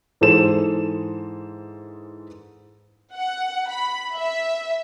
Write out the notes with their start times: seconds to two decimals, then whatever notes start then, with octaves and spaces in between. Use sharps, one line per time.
0.21 G#2 E3 G#4 A4 C5 E7
3.15 F#5
3.70 B5
4.16 E5